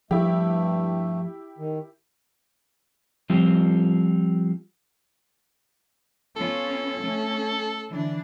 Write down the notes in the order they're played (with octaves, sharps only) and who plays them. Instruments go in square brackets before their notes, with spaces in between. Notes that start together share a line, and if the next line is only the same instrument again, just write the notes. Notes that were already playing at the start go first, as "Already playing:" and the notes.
[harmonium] G2 A3 [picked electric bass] F3 [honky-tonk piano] E4 G4
[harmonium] D#3
[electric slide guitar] F3 G3 C4 F4
[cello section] B3 C#4 F4 [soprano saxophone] A4
[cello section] A3 C#4
D3 E3 D4